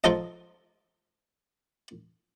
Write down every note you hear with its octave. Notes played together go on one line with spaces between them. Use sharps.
F3 D#4 F4 A4 D#5